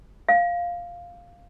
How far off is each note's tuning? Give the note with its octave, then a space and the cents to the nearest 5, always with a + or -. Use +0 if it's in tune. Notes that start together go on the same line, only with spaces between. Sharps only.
F5 +0